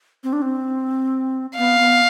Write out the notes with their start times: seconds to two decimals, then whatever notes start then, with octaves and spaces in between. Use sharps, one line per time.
0.24 C4
0.33 D4
0.42 C4
1.57 B3 F5
1.80 B3